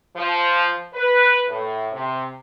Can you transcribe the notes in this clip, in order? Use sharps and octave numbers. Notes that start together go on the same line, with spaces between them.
F3
B4
A2
C3